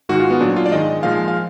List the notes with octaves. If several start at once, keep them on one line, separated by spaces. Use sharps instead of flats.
G#2 D#3 G#3 F#4
F4
B3
A#2 F#3 D4
F4
D5
G#2 D#3 G#3 D#5
A#2 F3 G#3 F5
F5